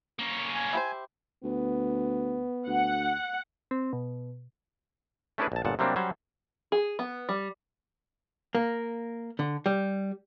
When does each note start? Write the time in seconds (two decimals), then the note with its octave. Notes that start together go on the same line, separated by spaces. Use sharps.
0.19 A#3 C#4
0.55 G#5
0.73 E4 G4 C5
1.44 D2 B3
2.67 D2 F#5
3.71 C4
3.93 B2
5.38 A3 C#4 D4 E4 G#4 B4
5.52 A#1 A5
5.65 G1 A#2 F#5 A5
5.79 C3 F#3 G3 A#3 C4 D4
5.96 F#3 G3 C#4 C5
6.72 G#4
6.99 B3
7.29 G3
8.55 A#3
9.39 D3
9.66 G3